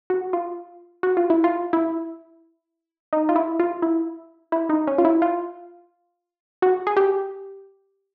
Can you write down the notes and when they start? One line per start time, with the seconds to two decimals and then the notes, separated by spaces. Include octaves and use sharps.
0.10 F#4
0.33 F4
1.03 F#4
1.17 F4
1.30 E4
1.44 F4
1.73 E4
3.13 D#4
3.29 F4
3.36 E4
3.59 F4
3.82 E4
4.52 E4
4.69 D#4
4.87 C#4
4.98 F4
5.05 E4
5.22 F4
6.62 F#4
6.87 G#4
6.97 G4